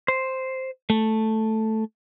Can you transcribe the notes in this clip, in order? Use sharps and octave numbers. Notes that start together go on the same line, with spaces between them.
C5
A3